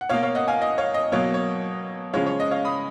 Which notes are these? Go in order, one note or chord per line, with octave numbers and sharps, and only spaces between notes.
F#5
B2 A#3 C#5 F5
C#5 F5
D#5 F#5
F5 G#5
D#5
C#5 F5
D#5
B2 F#3 A#3 C#5
C#5
C#3 F3 G#3 C#5 F5
C#5
D#5
C#5 F5
B5 D#6